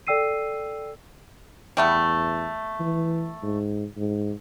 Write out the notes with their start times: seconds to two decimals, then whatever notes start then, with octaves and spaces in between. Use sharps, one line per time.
0.07 A4 D5 G5 E6 C7 D#7
1.77 E2 G3 A3 B3
2.80 E3
3.43 G#2
3.98 G#2